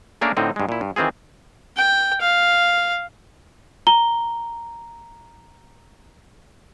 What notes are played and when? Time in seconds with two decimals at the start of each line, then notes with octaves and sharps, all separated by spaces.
0.21 A3 A#3 C#4 D4 G#4 A#4
0.37 A2 D3 C4 D#4
0.56 G2 G#3
0.69 A#2 E4
0.81 G2
0.96 D#3 E3 C4 F4 G#4
1.76 G5
2.21 F5
3.87 A#5 G7